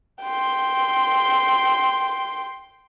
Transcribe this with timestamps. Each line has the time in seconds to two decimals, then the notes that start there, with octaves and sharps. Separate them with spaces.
0.23 G5 C6